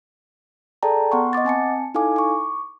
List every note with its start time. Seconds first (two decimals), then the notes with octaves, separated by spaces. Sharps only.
0.83 G#4 A4 D5 G5 A5 A#5
1.12 B3 F#5 C6 C#6
1.33 D#5 F#5 D6 A6
1.45 C4 G#5 A5 C#7
1.95 D#4 E4 A4 F5 G#5 D6
2.16 C#6 D6